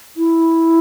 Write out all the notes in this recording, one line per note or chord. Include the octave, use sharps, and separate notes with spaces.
E4